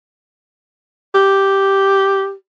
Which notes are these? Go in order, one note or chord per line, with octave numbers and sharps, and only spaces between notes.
G4